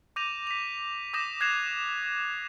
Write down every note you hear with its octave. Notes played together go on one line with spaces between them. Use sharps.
D6 G6 A#6 D#7 F7
B6 F7
D6 D#6 G6 A#6 E7
F#6 G#6 A#6 C7 E7 F7